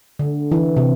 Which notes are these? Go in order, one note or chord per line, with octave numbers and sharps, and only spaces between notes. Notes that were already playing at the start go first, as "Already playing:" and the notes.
D3
E3
C3